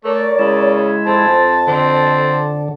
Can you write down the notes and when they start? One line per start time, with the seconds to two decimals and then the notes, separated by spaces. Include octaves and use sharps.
0.04 A3 A#4 C#5 D5
0.39 C#3 G#3 E4
1.06 F2 C4 A5
1.67 D3 C4